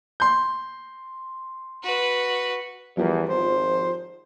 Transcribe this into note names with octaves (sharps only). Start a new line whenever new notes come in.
C6 G6
F#4 B4
E2 F3 G3 A#4
G#1 C5